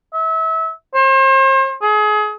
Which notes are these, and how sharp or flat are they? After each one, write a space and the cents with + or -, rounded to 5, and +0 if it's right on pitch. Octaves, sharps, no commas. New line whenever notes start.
E5 -30
C5 +40
G#4 +30